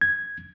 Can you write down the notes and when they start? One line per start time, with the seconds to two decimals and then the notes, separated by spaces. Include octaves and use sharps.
0.01 G#6